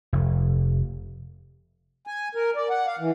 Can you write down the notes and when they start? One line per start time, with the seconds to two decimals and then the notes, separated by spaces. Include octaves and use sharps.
0.13 F1
2.07 G#5
2.35 A#4
2.56 D5
2.70 F#5
2.87 F5
2.99 E3